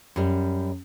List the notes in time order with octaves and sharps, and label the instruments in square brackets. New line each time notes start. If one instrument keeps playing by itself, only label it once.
[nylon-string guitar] F#2 G3